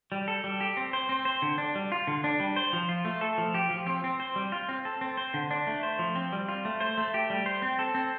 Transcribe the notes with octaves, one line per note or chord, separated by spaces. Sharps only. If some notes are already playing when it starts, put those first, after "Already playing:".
G3
A4
G3
G4
C4
C5
C4
C5
D3
D4
G3
F4
D3
D4
G3
C5
F3
F4
A3
A4
F3
G4
F3
C4
C4
C5
G3
F4
C4
A4
C4
C5
D3
D4
A3
C5
F3
C4
G3
F4
A3
C5
A3
G4
G3
C5
C4
A4
C4